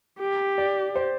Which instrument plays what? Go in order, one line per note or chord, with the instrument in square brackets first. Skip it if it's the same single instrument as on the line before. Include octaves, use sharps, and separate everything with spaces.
[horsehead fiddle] G4
[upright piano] D5
C5